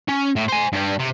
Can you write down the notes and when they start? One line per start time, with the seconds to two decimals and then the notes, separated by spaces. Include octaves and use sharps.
0.08 C#4
0.36 A2
0.48 C5 G#5
0.73 G2 G3
1.00 C3